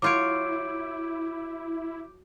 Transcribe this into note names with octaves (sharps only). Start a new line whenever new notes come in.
F#3 E4 F4 C#5 D6 G6 D7